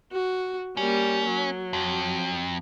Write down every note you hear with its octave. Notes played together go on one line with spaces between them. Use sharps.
F#4
G3 A#3 C#4
F#3
F2